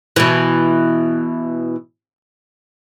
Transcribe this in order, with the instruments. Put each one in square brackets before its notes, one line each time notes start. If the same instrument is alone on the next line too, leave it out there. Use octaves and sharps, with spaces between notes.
[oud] B2 E3